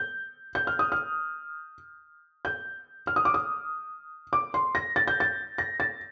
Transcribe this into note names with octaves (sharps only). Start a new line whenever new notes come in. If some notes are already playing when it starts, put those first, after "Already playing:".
Already playing: G6
G6
F6
D#6
F6
G6
F6
D#6
D6
D#6
D6
C6
A#6
A6
G6
A6
A#6
A6